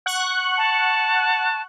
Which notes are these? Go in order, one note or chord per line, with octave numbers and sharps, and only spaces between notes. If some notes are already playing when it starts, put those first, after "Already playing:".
F#5 C#6 F#6
A5